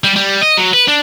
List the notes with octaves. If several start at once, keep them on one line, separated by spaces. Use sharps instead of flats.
G3
G3
D#5
F#3
B4
D4